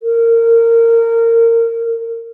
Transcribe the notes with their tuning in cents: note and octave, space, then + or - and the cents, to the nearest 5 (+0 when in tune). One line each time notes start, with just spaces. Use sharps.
A#4 -20